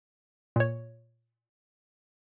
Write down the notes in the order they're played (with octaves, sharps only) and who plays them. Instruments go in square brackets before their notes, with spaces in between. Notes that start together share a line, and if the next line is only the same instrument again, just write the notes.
[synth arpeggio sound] A#2 C#5